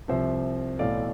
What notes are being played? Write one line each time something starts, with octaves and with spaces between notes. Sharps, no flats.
C2 C3 F3 C5 E5
B1 A2 E3 A3 D5 F5